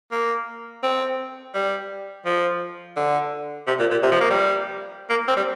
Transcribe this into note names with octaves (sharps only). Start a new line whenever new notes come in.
A#3
C4
G3
F3
D3
C3
A#2
A#2
C3
F3
A#3
G3
A#3
C4
G3